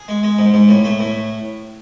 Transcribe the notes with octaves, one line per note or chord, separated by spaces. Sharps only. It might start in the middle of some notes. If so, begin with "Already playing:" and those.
Already playing: G#4
G#3
G#3
G#2
G#2
A2
A3
A2